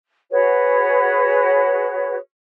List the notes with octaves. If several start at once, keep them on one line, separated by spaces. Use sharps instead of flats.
F#4 G#4 B4 C#5